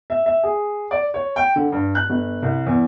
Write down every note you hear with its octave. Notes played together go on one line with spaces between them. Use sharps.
E5
E5
G#4
D5
C#5
G5
D3
G2
F#6
G1
C2
E2